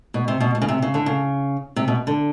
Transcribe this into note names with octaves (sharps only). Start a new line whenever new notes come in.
B2
C3
B2
B2
C#3
C3
C#3
D3
C#3
C3
B2
D3